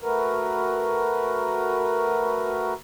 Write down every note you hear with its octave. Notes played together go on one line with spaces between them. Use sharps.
A3 F#4 A#4 B4